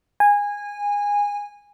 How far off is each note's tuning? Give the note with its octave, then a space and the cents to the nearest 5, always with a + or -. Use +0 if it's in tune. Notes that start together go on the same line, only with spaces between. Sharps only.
G#5 -20